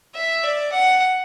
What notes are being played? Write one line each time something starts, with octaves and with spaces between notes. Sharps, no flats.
E5
D5
F#5